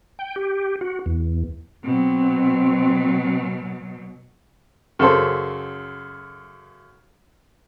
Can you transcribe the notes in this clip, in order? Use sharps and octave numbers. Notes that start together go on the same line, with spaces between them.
G5
G4
F#4
E2
B2 F#3 C4
F#2 C#3 A4 C5